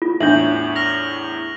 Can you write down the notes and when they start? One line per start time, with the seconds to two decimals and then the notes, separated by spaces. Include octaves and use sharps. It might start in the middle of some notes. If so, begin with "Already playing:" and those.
0.02 F4
0.21 E2 A2 D4 E5 G6 F#7
0.75 F6 A#6 F7